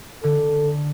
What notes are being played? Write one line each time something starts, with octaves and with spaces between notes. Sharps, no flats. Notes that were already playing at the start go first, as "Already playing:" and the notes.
D3 A4